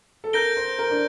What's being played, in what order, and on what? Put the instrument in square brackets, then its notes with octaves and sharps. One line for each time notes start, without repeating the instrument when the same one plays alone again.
[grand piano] A4
[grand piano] A#4 [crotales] G6 A#6 D7 G7
[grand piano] C5
A#4
D4